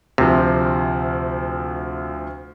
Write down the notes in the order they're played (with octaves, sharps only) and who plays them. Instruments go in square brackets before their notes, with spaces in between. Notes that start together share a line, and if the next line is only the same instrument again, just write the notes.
[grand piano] D2 F3 [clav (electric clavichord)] C3